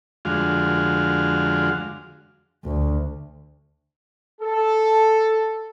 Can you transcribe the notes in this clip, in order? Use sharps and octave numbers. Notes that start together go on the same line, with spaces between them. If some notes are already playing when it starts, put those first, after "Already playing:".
F2 D3 G#3 F#4 F5
D2
A4